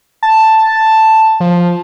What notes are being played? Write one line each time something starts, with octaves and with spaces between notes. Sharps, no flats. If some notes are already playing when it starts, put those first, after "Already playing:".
A5
F3